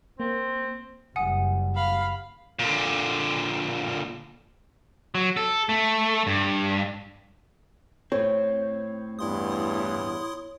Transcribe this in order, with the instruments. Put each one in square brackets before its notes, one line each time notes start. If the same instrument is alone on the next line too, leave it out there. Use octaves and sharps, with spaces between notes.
[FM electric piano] A#3 [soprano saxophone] C4
[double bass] F#1 G3 [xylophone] F#5 G#5 D#6
[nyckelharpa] F5 B5
[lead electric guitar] A#2 D3
F#3
A4
A3
G2
[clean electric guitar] A2 C4 [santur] C#5
[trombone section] E2 G2 [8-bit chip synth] E4 C6 D#6